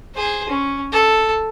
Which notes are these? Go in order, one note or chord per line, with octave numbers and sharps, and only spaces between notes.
G#4 C5
C#4
A4